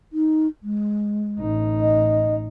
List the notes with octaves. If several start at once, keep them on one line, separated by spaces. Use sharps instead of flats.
D#4
G#3
A1 D#4
D#5